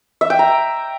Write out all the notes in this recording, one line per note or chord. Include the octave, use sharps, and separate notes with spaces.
E5
G5
A#5